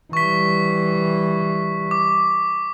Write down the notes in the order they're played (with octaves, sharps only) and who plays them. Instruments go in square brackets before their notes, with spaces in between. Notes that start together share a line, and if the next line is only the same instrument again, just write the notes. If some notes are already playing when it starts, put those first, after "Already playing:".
[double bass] E3 G3 [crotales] C#6 B6
[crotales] D6